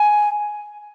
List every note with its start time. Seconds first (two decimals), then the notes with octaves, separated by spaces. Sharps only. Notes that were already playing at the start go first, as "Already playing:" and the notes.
Already playing: G#5